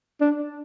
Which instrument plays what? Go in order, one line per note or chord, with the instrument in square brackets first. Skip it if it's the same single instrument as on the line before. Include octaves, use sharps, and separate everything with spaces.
[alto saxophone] D4